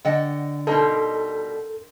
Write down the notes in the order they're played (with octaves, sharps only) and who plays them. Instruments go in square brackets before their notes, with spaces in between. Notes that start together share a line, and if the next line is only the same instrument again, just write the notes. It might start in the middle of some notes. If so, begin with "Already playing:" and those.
[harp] D3 [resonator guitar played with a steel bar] D#5 F#5 G5
[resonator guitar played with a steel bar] B2 G3 D#4 [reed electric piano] A4 A#4 [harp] D#5 G5 C6